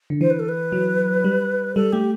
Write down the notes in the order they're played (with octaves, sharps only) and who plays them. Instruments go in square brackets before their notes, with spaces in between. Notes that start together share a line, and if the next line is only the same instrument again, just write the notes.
[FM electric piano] D3
[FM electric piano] E3 [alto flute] C5
[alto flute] B4
A4
B4
[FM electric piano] F#3
G3
[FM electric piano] G3 [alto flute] A4
[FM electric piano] A3 [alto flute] G4